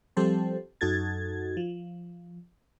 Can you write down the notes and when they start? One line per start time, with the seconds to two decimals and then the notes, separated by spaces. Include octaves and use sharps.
0.17 F3 G3 C4 G4 A4 C5
0.81 F#2 D#4 F#4 A4 G#6 A6
1.57 F3